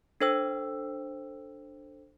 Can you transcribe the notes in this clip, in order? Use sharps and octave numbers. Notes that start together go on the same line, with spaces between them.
D4 A4 C5 G5 E6